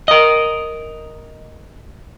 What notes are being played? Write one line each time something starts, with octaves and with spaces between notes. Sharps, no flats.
A#4 D#5